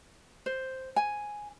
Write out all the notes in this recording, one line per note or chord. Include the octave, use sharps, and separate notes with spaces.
C5
G#5